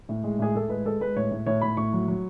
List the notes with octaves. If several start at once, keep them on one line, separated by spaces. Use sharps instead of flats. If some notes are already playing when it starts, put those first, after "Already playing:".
A2
G#3
A2 G#4
A2 A4
G#3 B4
G#3 A4
G#3 B4
A2 C#5
A2
A2 C#5
A2 B5
A2 C#6
F#3
F#3